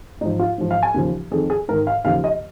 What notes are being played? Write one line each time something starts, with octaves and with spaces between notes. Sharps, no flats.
G#2 F3 D#4
F4
G#2 F3
F5
G#5
D#2 C#3 F3
F2 D#3 G#4
G#4
G#2 D#3 A#4
F5
D#2 C#3 F3 F5
D#5